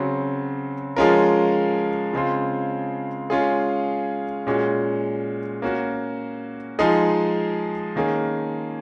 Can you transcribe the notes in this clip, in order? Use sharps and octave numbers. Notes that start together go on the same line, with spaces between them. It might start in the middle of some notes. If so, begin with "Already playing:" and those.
Already playing: C#3 F#3 C4 F#4
F3 G#3 C#4 F4 A#4
C#3 G#3 C4 F4
G#3 C#4 F4 G#4
A#2 G#3 C#4 F#4
A#3 C#4 F#4
F3 G#3 D#4 G#4
D#3 A#3 C#4 G#4